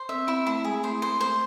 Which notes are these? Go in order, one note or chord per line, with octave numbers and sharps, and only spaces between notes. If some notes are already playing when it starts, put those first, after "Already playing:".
Already playing: C5
C4 E5
C4 E4
A3 E4
G#3 G#4
A3 C5
C5
C5